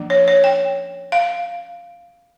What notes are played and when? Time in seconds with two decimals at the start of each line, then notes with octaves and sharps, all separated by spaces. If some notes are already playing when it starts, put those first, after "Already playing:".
Already playing: F3 A#3 D4
0.10 C#5
0.28 C#5
0.44 G5
1.12 F5